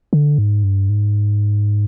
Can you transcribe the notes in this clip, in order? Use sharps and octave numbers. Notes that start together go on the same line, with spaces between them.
D3
G#2
G2
G#2